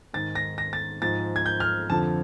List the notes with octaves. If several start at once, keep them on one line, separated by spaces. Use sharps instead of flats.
G#2 D#3 A6
A#6
A#6
A6
G#2 F3 A6
G#6
G6
F6
F2 D3 F3 A5